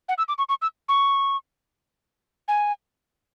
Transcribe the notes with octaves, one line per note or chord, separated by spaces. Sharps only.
F#5
E6
D6
C#6
C#6
E6
C#6
G#5